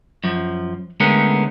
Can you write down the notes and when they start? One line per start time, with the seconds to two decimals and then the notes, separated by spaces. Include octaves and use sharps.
0.24 F#2 F3
1.00 D3 G#3 A3 B3 C#4 A#4